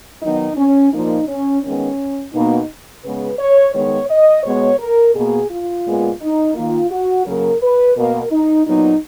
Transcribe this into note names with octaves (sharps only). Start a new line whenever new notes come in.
D#3 F#3 B3 D#4
C#4
A#2 F3 A#3 D#4
C#4
D#3 G#3 B3 C#4
B2 A#3 D#4
C#3 G#3 B3 B4
C#5
D#3 G#3 B3 C#5
D#5
B2 G#3 B3 C#5
A#4
B2 A#3 G#4
F4
A#2 G#3 B3
D#4
D#3 A#3 F4
F#4
C#3 F#3 A#3 A#4
B4
B2 A#3 A#4
D#4
A#2 F#3 B3 D#4